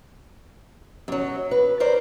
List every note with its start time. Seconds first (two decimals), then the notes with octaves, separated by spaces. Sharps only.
1.08 F#2 F#3
1.51 B4
1.80 A#4 C5 D5